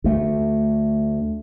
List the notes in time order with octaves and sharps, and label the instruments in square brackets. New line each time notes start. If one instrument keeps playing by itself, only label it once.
[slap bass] D2 A3